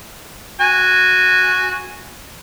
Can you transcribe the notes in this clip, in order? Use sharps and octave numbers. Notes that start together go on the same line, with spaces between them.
F#4 G#5